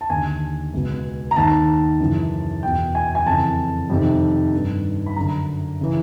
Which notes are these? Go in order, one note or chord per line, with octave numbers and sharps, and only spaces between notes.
A5
D#2 D3 G#5
C#2 B2
A#5
D#2 D#3 A5
F#2 C#3 E3
E2 B2 G5
G#5
G#5
F2 C#3 E3 A5
F2 C3 D#3
G2 D#3
B5
F#2 D3 A#5
C#3 E3